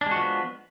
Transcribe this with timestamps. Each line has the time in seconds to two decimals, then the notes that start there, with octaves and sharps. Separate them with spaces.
0.01 D4
0.06 G#3
0.11 F#4
0.16 F3
0.21 B3